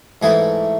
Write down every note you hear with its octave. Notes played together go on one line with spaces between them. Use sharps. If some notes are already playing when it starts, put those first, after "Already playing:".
G#2 E3 A3 E4 G#4